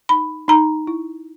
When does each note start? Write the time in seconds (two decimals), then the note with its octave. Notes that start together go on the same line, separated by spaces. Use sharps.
0.09 D#4 B5
0.48 D#4 A#5
0.87 E4